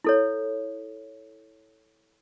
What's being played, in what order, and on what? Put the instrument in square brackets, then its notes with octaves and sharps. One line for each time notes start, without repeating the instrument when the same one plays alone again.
[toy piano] E4 A4 C#5